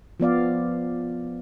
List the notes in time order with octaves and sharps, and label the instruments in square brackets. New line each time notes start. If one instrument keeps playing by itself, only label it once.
[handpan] F3 B3 D5 F5